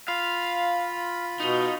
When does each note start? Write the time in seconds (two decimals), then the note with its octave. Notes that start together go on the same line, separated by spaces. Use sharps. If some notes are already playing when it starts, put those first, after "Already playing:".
0.08 F4 F5 B5
1.40 B2 D#4